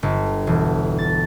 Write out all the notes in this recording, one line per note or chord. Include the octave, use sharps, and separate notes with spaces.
G1
E1
A6